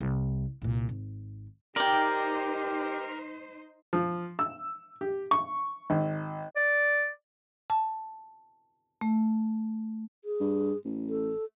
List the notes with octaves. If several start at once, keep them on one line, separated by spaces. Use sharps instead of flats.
C2
C2 A#2
G#1
D#4 G4 A#4 C5 D5 G5
F3
E6
G4
C#6
G#1
D5
A5
A3
G#4
G2
A1
A4